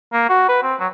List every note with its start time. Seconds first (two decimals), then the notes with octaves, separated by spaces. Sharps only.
0.13 A#3
0.29 F#4
0.49 B4
0.63 C4
0.80 F#3